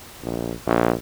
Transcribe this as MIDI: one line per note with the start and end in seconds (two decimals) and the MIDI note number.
0.23 0.53 34
0.66 0.93 34